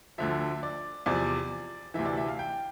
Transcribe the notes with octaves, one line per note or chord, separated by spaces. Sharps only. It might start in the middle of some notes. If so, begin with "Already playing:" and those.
D2 D3 F3 E5
D5
E2 C3 F3 D5
D2 C3 E3 E5
D5
E5
F5
G5